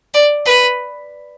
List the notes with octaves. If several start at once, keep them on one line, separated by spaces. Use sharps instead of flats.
D5
B4